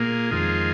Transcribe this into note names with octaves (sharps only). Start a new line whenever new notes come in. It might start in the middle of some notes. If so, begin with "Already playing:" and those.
Already playing: A#2 A#3 G#4
F2 D#3 G#3 F4 G#4